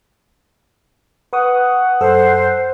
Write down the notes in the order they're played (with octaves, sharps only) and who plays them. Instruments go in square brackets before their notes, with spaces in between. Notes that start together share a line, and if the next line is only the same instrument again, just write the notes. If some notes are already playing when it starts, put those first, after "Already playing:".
[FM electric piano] B4 C#6 D#6 [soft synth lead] F#5
[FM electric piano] F#2 A4 E6 [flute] C5